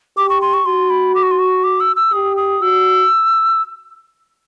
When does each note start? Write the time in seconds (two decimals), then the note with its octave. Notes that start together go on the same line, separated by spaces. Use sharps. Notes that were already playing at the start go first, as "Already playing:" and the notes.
0.17 G4 D6
0.29 C#6
0.41 C6
0.53 C#6
0.66 F#4 C6
0.90 B5
1.15 D6
1.23 C#6
1.31 C6
1.39 C#6
1.64 D6
1.80 E6
1.96 E6
2.13 G4 D#6
2.37 D#6
2.62 F#4 E6